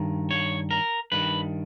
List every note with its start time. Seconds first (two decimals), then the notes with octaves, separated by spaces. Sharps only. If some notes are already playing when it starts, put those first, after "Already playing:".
Already playing: G2 D#3
0.31 C#5
0.71 A#4
1.12 G2 D#3 B4